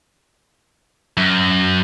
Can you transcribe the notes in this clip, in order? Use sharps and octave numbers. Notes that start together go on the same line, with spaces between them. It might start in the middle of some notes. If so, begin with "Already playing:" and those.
F#2